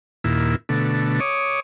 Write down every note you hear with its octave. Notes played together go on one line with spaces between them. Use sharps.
D#2 A#2 E4
B2 D3 A3
C#5 D6 D#6